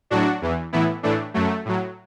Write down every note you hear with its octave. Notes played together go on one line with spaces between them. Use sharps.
A2 F#3 D4 F#4
E2 E3
A2 E3 B3 E4
A2 E3 A3 D4
F#2 F#3 A3
A2 F#3